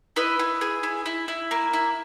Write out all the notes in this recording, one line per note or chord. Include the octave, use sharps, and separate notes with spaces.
E4 B4 D#5
E4
G#4
E4
E4
E4
A#3
E4